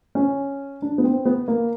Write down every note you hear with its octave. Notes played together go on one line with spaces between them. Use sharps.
C#4
D4
B3
C4
B3
A#3